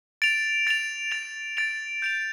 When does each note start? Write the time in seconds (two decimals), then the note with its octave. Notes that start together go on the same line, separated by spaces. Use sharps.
0.22 A6 D7 F7
0.67 A6 D7 F7
1.11 A6 D7 F7
1.57 A6 D7 F7
2.02 G6 D7 F7